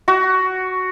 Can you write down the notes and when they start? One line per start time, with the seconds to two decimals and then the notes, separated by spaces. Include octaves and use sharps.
0.08 F#4